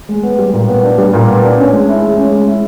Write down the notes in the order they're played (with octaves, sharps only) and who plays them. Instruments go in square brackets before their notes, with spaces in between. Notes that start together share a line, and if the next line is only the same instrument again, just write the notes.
[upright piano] G#3
B3
G3
A#2
B3
D4
G3
A#2
B3
D4
C#4
G#3
E4
G#3
C#4
G#3
E4